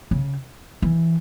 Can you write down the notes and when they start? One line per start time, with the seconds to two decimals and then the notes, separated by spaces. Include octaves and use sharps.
0.11 C#3
0.82 E3